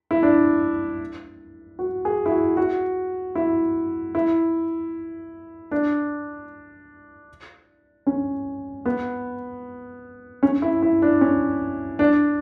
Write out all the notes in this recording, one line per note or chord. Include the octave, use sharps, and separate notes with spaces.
E4
D4
F#4
G#4
E4
F#4
F#4
E4
E4
D4
C#4
B3
C#4
E4
E4
D4
C#4
D4